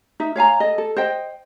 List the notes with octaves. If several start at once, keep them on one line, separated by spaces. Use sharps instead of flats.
D#4 E5
C#5 F5 G#5 A#5
A4 D#5
A4
C5 D#5 G5